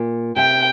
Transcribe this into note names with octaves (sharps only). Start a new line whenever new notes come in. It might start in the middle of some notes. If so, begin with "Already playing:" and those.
Already playing: A#2
C3 G5